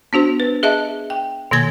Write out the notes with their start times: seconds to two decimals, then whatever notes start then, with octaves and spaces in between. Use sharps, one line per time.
0.13 B3 D4 F#4 C5
0.40 B4
0.63 G#4 D#5 E5 A5
1.10 G5
1.51 B2 D#3 A#3 G#6 A6